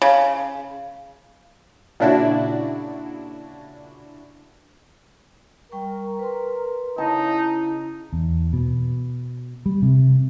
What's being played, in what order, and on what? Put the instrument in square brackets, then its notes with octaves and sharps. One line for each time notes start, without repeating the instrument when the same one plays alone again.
[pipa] C#3
[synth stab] A#2 C#3 D4 E4 F#4
[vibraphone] G3 G5 C#6 [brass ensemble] A#4
[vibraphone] B4 C6
[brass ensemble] C#3 [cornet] D#4 [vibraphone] E4 [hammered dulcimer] A5
[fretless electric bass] E2
B2
G3
C3